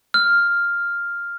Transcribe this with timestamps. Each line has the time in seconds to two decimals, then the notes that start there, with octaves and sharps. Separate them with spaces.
0.14 F6